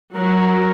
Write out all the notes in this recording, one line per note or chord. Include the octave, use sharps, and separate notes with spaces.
F#3 A#4